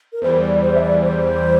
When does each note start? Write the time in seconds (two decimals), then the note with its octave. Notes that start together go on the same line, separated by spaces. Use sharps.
0.13 A#4
0.22 E2 E3 G3 C5
0.42 D5
0.61 C5
0.75 E5
0.82 D5
1.01 C5